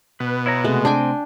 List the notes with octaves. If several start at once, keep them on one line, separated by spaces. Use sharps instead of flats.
B2 B4
E4 C#5 A#5
C3 G#3 A3 F#4
C4 D4 G5 G#5